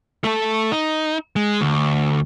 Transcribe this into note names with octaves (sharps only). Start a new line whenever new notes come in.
A3 A4
D#4
G#3
D2